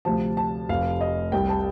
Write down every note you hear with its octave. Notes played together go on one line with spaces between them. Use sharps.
D2 C3 F3 A5
A5
F1 F2 C3 F5
D#5
C2 C3 G3 G5
A5